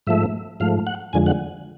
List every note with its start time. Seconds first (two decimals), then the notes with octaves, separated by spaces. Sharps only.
0.07 G#2 F3 A3 E5
0.60 G#2 F3 A3 F5
0.87 F#5
1.13 F2 D3 F3 G#3 G#5
1.26 F#5